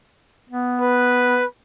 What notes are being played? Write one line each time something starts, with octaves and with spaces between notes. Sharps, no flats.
B3
B4